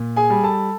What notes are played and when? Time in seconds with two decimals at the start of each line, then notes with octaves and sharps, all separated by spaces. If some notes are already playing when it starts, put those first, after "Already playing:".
Already playing: A#2
0.16 G#4 G#5
0.30 G3
0.43 A4 A5